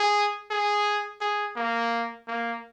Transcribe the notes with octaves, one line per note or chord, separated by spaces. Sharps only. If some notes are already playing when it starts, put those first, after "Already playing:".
Already playing: G#4
G#4
G#4
A#3
A#3